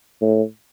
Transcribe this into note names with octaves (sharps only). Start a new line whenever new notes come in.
A2